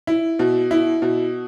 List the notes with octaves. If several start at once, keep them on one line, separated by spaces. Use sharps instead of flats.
E4
B2
E4
B2